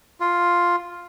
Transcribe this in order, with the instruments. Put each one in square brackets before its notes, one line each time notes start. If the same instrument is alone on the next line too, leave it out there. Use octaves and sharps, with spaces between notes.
[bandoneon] F4